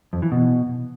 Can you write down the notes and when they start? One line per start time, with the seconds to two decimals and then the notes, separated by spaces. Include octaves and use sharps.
0.13 F2
0.22 E3
0.32 B2